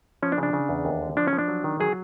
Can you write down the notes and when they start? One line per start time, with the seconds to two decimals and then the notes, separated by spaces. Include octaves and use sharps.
0.22 F3 C#4
0.32 D4
0.38 C#3
0.43 D4
0.53 C#3
0.69 E2
0.85 D#2
1.02 D3
1.17 F3 D4
1.28 C#4
1.33 F3
1.39 D4
1.48 F#3
1.64 D#3
1.80 F#3 G#4